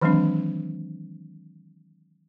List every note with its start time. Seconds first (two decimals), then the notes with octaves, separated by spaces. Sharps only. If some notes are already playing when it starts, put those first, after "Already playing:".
0.01 D#3 E3 F#3 G#3 C4 D4